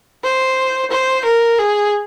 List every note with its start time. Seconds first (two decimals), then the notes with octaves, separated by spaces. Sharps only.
0.24 C5
0.91 C5
1.25 A#4
1.58 G#4